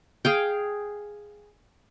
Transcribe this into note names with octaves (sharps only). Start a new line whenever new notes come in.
G#4 F5 G5